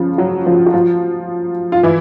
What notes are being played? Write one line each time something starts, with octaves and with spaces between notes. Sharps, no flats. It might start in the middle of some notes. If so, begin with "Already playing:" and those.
Already playing: C#3 F3 F4
F#3 F#4
F3 F4
F#4
F3 F4
F4
E3 E4